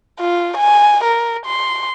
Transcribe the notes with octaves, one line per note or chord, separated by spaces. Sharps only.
F4
G#5
A#4
C6